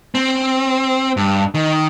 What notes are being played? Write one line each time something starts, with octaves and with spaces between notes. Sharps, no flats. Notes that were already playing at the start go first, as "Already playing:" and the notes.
C4
G2
D#3